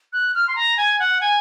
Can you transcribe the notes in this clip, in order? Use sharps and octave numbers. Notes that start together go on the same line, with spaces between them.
F#6
F6
C6
A#5
G#5
F#5
G#5